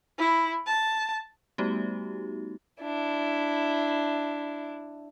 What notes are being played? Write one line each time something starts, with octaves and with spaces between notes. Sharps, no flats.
E4
A5
G3 A3 B3 D#4 F#4 G4
D4 E4